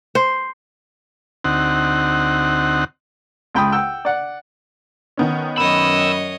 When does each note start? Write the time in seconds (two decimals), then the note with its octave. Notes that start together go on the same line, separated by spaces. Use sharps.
0.15 C5
1.45 D2 C4 D#4 F#5
3.55 C#2 G5 B5 D#6
3.72 F#5 G5 E6
4.05 D5 F#5
5.17 D#3 B3 C#4
5.58 F#2 C#5 D#5 B5 E6